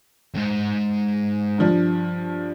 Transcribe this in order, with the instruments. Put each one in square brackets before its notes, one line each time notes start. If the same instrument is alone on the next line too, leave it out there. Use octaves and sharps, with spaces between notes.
[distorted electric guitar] D2 G#2
[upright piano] G2 F3 D4